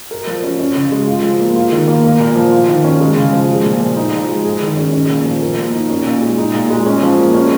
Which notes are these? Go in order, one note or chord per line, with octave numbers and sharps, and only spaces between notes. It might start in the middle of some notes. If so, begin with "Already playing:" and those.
A#4
F3
C#4
C#4
C#3
G#3
F4
F3
A#3
F4
D#3
A#3
A#3
A#2
F3
F4
D#3
C#4
G#3
C#3
F3
G#3
A#2
F3
D#4
F3
G#3
G#4
D#3
C#4
C#4
A#2
F3
A#4
A#3
D#4
C#4
A#2
G#3
D#4
A#2
G#3
C#4
F3
A#3
C#4